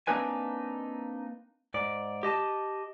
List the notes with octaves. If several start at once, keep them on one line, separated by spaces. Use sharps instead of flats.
A#3 C4 D4 D#4 B4 G#5
G#2 D5
G4 D#5 A5